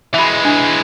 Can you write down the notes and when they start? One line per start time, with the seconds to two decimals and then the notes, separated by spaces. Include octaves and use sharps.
0.14 E3 G#3 E5 B5
0.45 D4